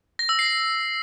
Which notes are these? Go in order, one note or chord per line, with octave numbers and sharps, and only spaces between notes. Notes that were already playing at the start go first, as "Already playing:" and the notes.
A#6
E6
C7